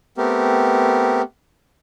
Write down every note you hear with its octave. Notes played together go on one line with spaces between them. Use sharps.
A3 B3 C4 G4 A#4